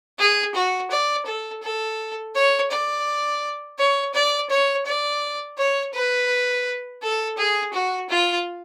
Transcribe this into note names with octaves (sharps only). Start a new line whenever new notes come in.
G#4
F#4
D5
A4
A4
C#5
D5
C#5
D5
C#5
D5
C#5
B4
A4
G#4
F#4
F4